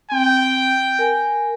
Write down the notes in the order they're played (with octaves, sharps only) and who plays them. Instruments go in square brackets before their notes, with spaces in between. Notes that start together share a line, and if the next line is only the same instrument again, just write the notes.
[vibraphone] C4 [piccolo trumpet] G5
[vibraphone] A#4 G#5